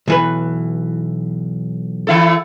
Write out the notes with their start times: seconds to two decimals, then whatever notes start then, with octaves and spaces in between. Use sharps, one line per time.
0.08 B1 E3 B4
2.07 E3 E4 A4